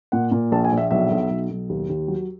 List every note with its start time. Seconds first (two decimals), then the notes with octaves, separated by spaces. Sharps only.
0.12 A#2 F#5
0.32 A#2
0.51 A#1 A5
0.64 G#5
0.72 A#1
0.78 E5
0.91 B1 E5
1.11 B1
1.30 B1
1.50 B1
1.69 D#2
1.89 D#2
2.08 F#3